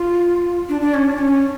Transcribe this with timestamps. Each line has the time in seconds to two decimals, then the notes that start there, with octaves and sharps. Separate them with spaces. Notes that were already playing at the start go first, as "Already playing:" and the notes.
Already playing: F4
0.69 D4
0.81 D4
0.94 C#4
1.06 D4
1.18 C#4